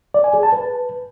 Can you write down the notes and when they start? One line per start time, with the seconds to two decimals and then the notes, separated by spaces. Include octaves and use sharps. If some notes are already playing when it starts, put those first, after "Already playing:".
0.14 D5
0.24 G#5
0.34 G#4
0.43 A5
0.53 B4